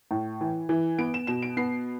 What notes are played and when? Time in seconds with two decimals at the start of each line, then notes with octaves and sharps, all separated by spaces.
0.11 A2
0.41 E3
0.69 E3
0.99 B3 D7
1.14 E7
1.27 B2 E7
1.42 D7
1.57 B3 C7